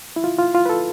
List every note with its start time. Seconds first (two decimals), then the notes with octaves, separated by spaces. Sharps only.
0.16 E4
0.24 F4
0.39 F4
0.55 F4
0.66 B4
0.69 A4